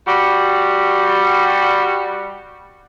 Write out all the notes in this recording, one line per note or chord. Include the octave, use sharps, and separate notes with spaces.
G3 F#4